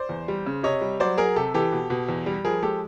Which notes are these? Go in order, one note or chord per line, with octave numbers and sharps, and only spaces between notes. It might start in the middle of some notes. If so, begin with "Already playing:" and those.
Already playing: C5 D5
E2
G3
C#3
C3 C#5 D#5
G3
F#3 C5 D5
F#3 G#4 A#4
C3 G4 A4
E3 G4 A4
B2
B2
E2
G3
F3 G#4 A#4
G#3 G4 A4